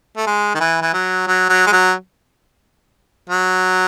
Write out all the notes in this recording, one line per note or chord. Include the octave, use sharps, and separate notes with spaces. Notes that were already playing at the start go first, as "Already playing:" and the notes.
A3
G#3
D#3
E3
E3
F#3
F#3
F#3
G#3
F#3
F#3